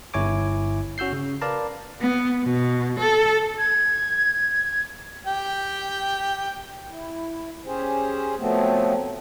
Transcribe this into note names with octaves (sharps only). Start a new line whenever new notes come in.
G1 E4 C#5 G#5 D6
C#4 F#4 E6 G6 C7
C#3
A#4 B4 D5 F5 A5 A#5
B3
B2
A4
G#6
G4 G5
E4
C#4 G4 G#4 C5
F3 F#3 A3 B3 C4